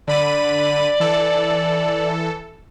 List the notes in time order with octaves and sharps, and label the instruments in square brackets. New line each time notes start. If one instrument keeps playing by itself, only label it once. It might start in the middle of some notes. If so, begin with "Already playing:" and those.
[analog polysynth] D3 B5 D#7 [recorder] D5
[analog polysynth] E3 A4